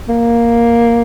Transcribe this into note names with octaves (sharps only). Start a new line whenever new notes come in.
A#3